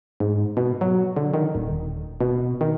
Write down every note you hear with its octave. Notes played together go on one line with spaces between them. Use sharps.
G#2
B2
F#3
D3
D#3
D#1
B2
D#3